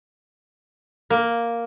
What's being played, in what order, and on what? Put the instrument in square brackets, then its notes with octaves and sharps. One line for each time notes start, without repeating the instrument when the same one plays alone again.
[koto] A#3